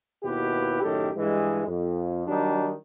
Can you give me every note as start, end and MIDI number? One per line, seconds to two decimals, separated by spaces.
0.24 0.79 39
0.24 0.79 47
0.24 0.79 64
0.24 0.79 67
0.24 0.79 71
0.82 1.09 42
0.82 1.09 45
0.82 1.09 51
0.82 1.09 67
0.82 1.09 69
1.16 1.63 43
1.16 1.63 52
1.16 1.63 56
1.67 2.24 41
2.27 2.74 51
2.27 2.74 54
2.27 2.74 55
2.27 2.74 62
2.27 2.74 63